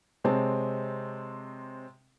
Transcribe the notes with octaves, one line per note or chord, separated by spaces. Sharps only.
C3 G#3 C4 C#5 A5